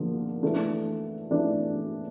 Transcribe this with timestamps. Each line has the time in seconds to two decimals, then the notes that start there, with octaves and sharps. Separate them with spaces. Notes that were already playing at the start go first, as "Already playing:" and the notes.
Already playing: D3 F3 A#3
0.42 E3 A3 D4
1.31 E3 A3 D4